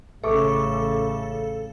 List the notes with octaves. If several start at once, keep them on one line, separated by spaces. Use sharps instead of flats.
A1 C#3 A4 E5 C#6 D6